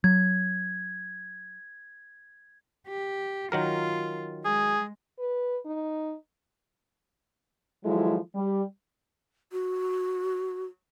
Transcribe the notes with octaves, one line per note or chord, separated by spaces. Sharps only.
F#3 G#6
G4
D#3 F#3 F4 A#4
G#3 G#4
B4
D#4
D#3 F3 F#3 G#3 E4 A4
G3
F#4